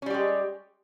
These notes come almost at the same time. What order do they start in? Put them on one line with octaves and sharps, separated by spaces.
C#4 G3 G4 G#3